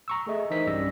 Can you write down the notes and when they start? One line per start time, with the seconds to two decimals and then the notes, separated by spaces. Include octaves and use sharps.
0.08 A#5 C#6 E6
0.26 A3 G#4 A4 D#5 E5
0.50 E3 D#4 A#4 C5 D#5 B6
0.67 B1 G2 G3 C#4 E6 A#6